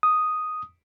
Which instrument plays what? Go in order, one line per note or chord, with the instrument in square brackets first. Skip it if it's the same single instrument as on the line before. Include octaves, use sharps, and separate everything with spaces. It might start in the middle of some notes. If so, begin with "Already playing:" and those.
[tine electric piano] D#6